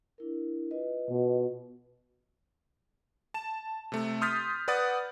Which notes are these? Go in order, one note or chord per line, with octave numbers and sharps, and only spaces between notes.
D4 E4 A#4
F4 B4 D#5
B2
A5 E7
C3 A3
C6 D#6 F6 G6 A6 B6
B4 D5 F#5 D#6 A6